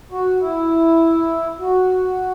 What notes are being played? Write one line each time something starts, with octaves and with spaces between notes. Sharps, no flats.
F#4
E4
F#4